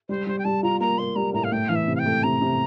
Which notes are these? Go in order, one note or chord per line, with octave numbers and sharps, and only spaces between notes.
G3 C5
G3 C5
G5
G3 A5
F4 A#5
A#3 A#5
A#3 C6
G3 A#5
A2 A#5
F5
A3 G5
E3 F5
E5
C3
F5
G5
A3
C3 A#5
C3